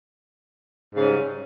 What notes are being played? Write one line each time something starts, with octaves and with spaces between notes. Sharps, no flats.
G#2 C#3 G3 C#4